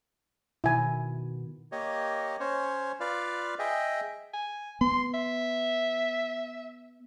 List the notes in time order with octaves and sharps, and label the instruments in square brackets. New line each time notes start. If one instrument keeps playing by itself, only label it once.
[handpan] B2 D#3 [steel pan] E4 G#5
[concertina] A#3 G4 C#5 D#5
C#4 C5 C#5
F4 B4 D5 F5
G#4 D#5 E5 G5
[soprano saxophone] G#5
[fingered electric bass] B3 [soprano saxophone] C6
[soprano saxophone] E5